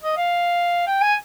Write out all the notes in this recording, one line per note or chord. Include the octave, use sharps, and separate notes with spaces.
D#5
F5
G5
G#5